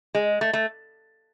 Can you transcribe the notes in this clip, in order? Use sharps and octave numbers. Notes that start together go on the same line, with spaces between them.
G#3
A3
A3